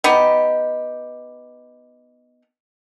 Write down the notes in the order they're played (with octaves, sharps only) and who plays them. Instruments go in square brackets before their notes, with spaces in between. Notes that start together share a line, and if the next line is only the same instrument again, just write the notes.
[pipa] B3 D#4 G4